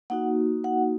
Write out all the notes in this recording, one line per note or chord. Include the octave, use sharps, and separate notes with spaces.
A#3 D#4 F#4 F#5
F#5